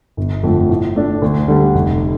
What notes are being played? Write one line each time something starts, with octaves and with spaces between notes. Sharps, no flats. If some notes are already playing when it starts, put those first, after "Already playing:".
G1
F2 D3 A3
A2
A3 D4
D2
D3 G3
F1